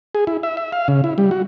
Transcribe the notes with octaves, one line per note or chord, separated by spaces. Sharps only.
G#4
E4
E5
E5
F5
C#3
E4
G3
F#4